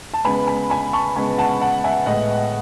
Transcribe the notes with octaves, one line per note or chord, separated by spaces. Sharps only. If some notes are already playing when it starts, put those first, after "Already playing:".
A5
C#3 G#3 B3 G#5 B5
G#5 B5
G#5 B5
A5 C#6
C#3 G#3 B3 G#5 B5
F#5 A5
F#5 A5
E5 G#5
A2 G#3 B3 D#5 F#5